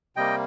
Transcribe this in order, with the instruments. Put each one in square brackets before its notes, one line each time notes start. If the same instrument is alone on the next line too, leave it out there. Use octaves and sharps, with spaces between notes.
[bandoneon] C3 G3 A#3 D#5 G5